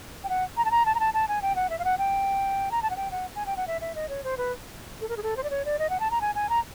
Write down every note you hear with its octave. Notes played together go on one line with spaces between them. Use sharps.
G5
F#5
A#5
A5
A#5
A5
A#5
A5
A5
G#5
G5
F#5
E5
F5
F#5
G5
A#5
A5
F#5
G5
F#5
G#5
G5
F#5
E5
E5
D#5
C#5
C5
B4
A4
A#4
G#4
A4
C5
D5
C#5
D5
D#5
F#5
A5
A#5
G#5
G#5
A#5